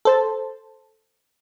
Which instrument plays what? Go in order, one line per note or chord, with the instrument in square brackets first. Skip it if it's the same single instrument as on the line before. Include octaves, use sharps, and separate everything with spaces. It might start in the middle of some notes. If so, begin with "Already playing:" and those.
[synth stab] A4 C5 A5